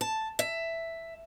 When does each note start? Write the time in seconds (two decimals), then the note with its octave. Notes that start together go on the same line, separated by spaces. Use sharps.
0.01 A5
0.39 E5